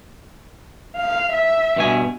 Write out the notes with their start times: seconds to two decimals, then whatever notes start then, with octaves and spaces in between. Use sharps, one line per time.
0.96 F5
1.32 E5
1.76 G2 B2 G#5